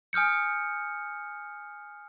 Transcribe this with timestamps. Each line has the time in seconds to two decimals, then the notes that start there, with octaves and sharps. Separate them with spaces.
0.13 G#5 D#6 F6 G6 C#7